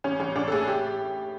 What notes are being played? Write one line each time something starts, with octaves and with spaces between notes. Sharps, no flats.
A1 C#4
A1 C#4
A1 D4
A4
A2 G#4
G4